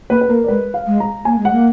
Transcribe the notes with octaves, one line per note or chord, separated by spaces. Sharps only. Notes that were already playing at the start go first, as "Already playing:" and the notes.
A#3 B4
B4
A#3 A#4
D5
G#3 B4
F5
G#3
A#5
A#3 G#5
G#3
F#5
A#3